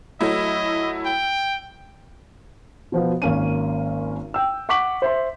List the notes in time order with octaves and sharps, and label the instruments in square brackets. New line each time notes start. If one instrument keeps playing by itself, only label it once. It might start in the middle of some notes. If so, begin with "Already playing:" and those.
[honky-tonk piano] F#3 A3 E4 [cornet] D#5
[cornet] G5
[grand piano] B2 F3 B3
G#1 A#3 C#4 D#7
G5 E6
F#5 C#6 D6 B6 F#7
C5 E5 C6